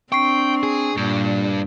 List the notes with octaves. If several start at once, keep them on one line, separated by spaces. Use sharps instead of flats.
C4 D4 G5 C#6 C7
G#4
G2 A#2 D4